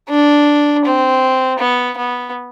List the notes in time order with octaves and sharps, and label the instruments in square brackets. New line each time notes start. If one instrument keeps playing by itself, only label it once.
[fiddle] D4
C4
B3
B3